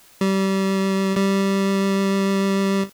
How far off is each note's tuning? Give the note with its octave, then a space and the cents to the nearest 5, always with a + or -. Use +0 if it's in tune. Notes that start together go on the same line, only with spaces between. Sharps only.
G3 -25
G3 -5